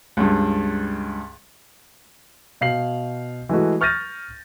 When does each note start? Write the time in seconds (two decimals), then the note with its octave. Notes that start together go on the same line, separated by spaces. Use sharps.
0.17 C#2 G2
2.61 B2 F5 C7 F#7
3.49 E3 G#3 A3 F#4
3.81 C#6 F6 G6 A6 A#6 D#7